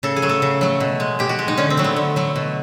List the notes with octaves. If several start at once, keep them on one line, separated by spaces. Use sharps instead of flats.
C#3 A4
G#4
F#3 A3
A4
C#3
F#3 A3
B2
G#3
B2 G4
F#4
G#3
D#4
D3 C#4
C4
F#3 A3
B3
D3
F#3 A3
B2